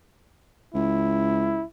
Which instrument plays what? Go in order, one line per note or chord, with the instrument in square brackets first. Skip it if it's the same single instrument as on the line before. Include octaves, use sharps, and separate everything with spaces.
[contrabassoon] C#2 [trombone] E4